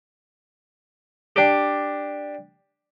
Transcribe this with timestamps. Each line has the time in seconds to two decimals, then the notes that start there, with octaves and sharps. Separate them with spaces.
1.36 D4 G4